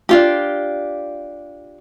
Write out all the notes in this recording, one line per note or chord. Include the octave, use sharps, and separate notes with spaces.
D4 F4 G4